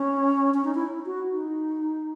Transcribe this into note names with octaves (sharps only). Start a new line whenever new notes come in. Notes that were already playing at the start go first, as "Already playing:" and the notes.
Already playing: C#4
C#4
D#4
E4
F#4
D#4